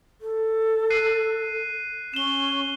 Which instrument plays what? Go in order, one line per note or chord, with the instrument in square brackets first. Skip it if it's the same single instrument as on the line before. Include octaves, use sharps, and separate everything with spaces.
[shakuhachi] A4
[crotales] F#6 C7 D#7
[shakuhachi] C#4 [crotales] E7 G7